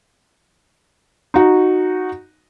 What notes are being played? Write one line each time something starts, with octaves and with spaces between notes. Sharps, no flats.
D#4 F#4